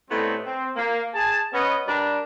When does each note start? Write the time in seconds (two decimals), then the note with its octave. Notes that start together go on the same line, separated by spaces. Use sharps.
0.11 A2 G3 A3 B3 C4 D#4
0.45 C4
0.76 A#3
1.14 G#4 A5
1.53 B3 C#4 D#5
1.87 G3 D4 A#4